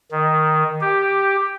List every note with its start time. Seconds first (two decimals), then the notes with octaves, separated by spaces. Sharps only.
0.12 D#3
0.81 G4